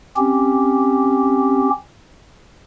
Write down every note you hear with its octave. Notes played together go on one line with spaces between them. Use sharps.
C4 C#4 G4